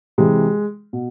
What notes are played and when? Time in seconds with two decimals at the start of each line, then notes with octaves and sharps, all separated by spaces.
0.18 C3 E3 G#3
0.93 B2